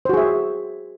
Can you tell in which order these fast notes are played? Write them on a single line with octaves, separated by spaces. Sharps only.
C5 F#4 G#4 E5